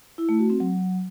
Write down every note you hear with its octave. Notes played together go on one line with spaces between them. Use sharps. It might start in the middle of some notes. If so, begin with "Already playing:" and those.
E4
A3
F#4
C4
F#3